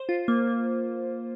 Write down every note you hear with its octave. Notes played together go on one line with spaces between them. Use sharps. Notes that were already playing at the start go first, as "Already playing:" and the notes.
Already playing: C5
F4
A#3
A#3